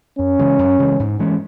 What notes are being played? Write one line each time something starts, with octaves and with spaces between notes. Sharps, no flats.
F#2 C#4
C#3 E3 G#3
F#2
C#3 E3 G#3
G#2
E3 G#3 C#4